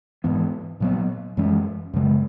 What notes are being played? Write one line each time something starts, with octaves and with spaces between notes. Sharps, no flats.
G#2 E3 B3
A#2 F#3 B3
F#2 E3 G#3 C#4
F#2 C#3 G#3